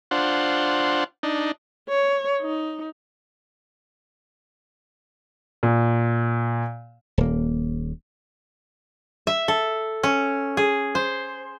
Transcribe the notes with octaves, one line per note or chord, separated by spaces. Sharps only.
D4 F4 C5 F#5
D4 D#4
C#5
D#4
A#2
D#1 A#3
E5
A4
C#4
G#4
C5